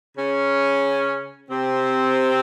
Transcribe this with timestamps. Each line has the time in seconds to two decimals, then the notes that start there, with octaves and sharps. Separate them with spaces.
0.16 C#3 C#4
1.49 C3 C4